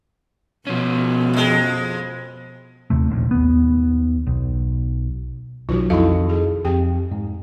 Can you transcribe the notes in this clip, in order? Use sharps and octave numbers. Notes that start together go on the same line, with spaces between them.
B2 F3 C#4
F2 G#3
D#2 C3 A3
D#1 A#1 D#2
D#2 B3
B1
B1 D#3 F#3 F4 F#4
F2 D#4 E4 A4 D#5 F5
G#4
F2 C4 G4 G5
G#2